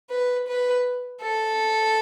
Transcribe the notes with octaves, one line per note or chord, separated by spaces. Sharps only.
B4
B4
A4